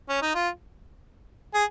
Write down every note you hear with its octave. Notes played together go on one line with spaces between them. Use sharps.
C#4
D#4
F4
G#4